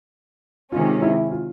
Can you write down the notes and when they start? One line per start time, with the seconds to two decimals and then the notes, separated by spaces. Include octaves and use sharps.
0.72 C3 D#3 G#3 C#4 F4
1.02 E4
1.32 F4